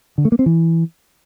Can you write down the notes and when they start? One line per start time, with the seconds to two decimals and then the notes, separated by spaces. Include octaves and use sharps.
0.18 D3
0.25 A3
0.32 A#3
0.39 C4
0.46 E3